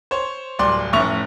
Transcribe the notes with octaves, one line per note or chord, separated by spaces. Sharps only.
C5 C#5
D1 C2 D5 C6
F1 A2 C#4 E5 C#6 F7